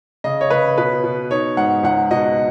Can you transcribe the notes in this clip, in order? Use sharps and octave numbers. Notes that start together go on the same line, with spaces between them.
C#3 D#5
C#5
C#3 B4
B2 B4
B2
D#4 C#5
G#2 F#5
C#2 F#5
B2 D#5